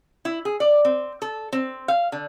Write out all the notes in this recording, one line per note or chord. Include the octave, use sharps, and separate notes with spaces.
E4
G#4
D5
C4
A4
C4
F5
D3